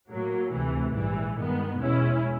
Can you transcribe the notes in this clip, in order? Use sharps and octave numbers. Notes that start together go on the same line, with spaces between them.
A2 F#3 A#3
D2 C3 E3 A3
A#1 G#2 E3 G3
G2 D#3 G#3 B3
E2 B2 G#3 C#4 E4